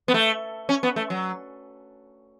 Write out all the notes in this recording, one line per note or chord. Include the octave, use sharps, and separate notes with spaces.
B3
A3
C#4
B3
A3
F#3